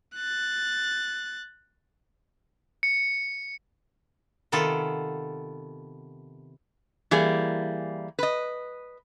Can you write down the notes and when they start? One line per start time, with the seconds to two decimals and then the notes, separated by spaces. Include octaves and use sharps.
0.16 F#6 A6
2.83 C#7
4.52 C3 D#3 B3 F4 A4
7.11 E3 G3 A#3 G#4
8.19 B4 D#5